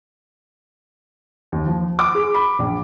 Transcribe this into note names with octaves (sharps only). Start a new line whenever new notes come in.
D#2
F3
D6
G#4
B5
A#1